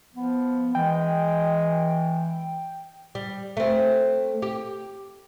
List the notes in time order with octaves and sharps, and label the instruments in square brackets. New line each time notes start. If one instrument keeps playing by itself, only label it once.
[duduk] F3 [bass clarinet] B3
[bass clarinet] E3 [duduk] G#3 [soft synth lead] G5
[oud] G3
A3 C4
G4